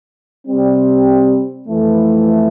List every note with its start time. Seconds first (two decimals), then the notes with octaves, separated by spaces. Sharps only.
0.46 C3 G3 C4
1.67 F2 E3 A3